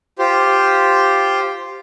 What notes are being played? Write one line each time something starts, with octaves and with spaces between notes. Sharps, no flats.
F4 G4 C5